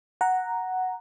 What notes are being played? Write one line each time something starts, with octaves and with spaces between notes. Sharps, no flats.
F#5 A#5